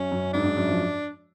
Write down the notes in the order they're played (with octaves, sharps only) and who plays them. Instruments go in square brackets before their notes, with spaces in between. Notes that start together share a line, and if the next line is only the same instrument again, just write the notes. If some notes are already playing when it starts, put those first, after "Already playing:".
Already playing: [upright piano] F#2 [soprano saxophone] C#4
[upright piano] F#2
[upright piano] G#2 [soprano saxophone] D4
[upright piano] G#2
F#2
F3